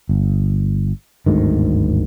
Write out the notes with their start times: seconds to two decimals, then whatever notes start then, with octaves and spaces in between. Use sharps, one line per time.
0.09 G1
1.26 G1 D2 G#2 D#3